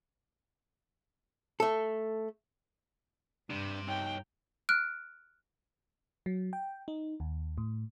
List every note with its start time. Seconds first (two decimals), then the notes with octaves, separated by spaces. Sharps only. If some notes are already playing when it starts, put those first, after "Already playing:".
1.60 A3 A4
3.50 G2 C3 G3 D4
3.88 D#4 C#5 G5
4.69 F6 F#6 D7
6.26 F#3
6.53 G5
6.88 D#4
7.20 D#2
7.58 A2